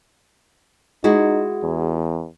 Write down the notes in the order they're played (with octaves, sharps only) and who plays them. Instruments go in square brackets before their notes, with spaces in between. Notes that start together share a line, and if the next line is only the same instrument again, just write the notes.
[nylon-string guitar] G#3 E4 F#4 [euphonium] D#4
[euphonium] E2